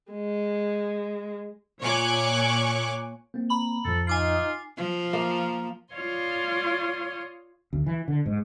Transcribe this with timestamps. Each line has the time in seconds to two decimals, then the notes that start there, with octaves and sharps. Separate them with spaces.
0.12 G#3
1.82 A#2 C#5 G#5 C#6 D6 F#6
3.34 A#3 C4
3.50 A#5 B5 F#7
3.85 F2 A2 F3 A4
4.07 D#4 F4 G#5 D6 C7
4.77 F3
5.13 A#3
5.94 F4 C#5 D5 F5 C6 D#6
7.73 D2
7.86 E3
8.08 D3
8.26 G#2